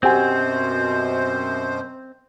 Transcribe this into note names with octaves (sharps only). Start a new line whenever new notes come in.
F#2 B2 C4 F#4 G4 C5 G#5